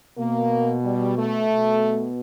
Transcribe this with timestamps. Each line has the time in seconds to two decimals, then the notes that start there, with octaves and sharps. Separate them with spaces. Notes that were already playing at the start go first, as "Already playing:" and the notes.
0.18 B2 A#3
0.84 G3
1.18 A3
1.51 B2